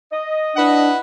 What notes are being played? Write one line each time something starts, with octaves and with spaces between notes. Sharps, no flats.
D#5
D4 E4 B4 F#5